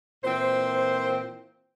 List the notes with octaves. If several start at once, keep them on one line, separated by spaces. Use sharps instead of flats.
A#2 E3 C4 C5